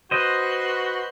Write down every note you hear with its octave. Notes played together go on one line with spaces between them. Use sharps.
F#4 B4 C5 D#5 C6